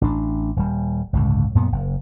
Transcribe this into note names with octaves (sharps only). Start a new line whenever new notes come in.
A1 D4
D#1 G3
G1 C#2 A2
F#2 A#2 B3
F#1